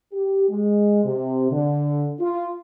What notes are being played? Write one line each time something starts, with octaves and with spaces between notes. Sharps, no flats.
G4
G#3
C3
D3
F4